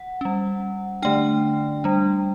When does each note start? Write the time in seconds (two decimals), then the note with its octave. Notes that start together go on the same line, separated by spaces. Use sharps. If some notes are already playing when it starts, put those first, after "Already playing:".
Already playing: F#5
0.21 G3 C#4
1.02 D3 A3 D4 G5
1.84 G3 D4